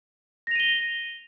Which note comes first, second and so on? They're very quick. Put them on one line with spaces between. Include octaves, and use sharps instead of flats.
A#6 F7 D#7 G7